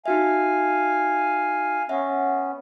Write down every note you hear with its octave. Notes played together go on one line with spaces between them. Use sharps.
D#4 F#4 E5 F5 G#5
B3 C#4 E5 F#5